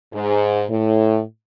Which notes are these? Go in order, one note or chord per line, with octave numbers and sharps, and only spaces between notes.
G#2
A2